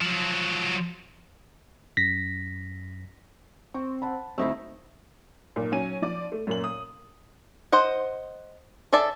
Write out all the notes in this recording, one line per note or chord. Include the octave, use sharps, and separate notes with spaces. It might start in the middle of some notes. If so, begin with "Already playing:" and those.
F3 F#3
F#2 A#6 B6
C4 C#6
F#5 A5 B5
D2 A3 C4 D#4 E4 C5 E6
B1 A#2
F#3 C#4 G#5 D#7
F3 D5 D6
A3
F#2 A#2 F#7
D#6
C5 D#5 F#5
G#4 A4 D5 E5 A5